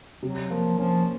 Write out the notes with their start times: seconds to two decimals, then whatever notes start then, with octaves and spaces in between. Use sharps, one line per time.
0.23 C3 F#3
0.50 F3 A#3
0.78 F3 C#4